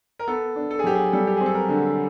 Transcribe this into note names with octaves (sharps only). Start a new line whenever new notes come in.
A#4
B3 A4
D4
A4
G#4
F#3 G4
G#4
G3 A4
G4
C4 G#4
A4
A#4
D3